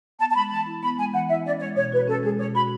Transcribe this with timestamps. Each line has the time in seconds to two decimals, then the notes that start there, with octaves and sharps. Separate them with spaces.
0.19 B3 A5
0.29 A5
0.35 G#3 B5
0.51 E3 A5
0.66 E4
0.82 B3 B5
0.97 G#3 G#5
1.13 E3 F#5
1.29 E4 E5
1.45 C#4 D5
1.60 G#3 C#5
1.76 B2 C#5
1.92 F#4 B4
2.08 C#4 A4
2.23 G#3 G#4
2.39 B2 C#5
2.55 F#4 B5